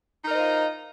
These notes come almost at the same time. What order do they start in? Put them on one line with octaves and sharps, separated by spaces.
D#4 A#4 D#5 C5 F4